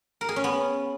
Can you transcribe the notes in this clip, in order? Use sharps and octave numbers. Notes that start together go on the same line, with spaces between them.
A#4
G#4
C#4
B3